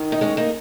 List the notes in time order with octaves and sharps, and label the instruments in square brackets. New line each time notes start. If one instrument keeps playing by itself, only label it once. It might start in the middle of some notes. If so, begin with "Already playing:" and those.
Already playing: [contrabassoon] D#3
[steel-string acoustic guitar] D#4
G#3 C#4
A#3 D#4